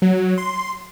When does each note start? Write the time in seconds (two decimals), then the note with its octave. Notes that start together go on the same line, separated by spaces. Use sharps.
0.02 F#3
0.38 C6